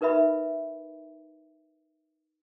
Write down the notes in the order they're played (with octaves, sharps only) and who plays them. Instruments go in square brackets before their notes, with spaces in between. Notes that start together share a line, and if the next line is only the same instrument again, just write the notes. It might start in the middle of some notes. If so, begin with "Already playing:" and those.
[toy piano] D#4 A#4 B4 E5 B5